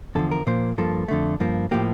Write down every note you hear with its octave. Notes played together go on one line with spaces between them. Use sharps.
E2 D3 F3 A4
A#4
A#2 F3 A#3 C5
G2 F3 A#3 A4
F2 D3 A3
G2 F3 A#3
A2 F3 A#3 G4